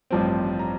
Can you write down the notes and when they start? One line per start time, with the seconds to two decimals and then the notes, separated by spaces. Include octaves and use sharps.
0.11 A1 G2 F3 C4
0.59 A#5